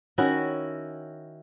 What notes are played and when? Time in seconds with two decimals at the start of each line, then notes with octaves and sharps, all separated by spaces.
0.18 D#3 C#4 E4 F#4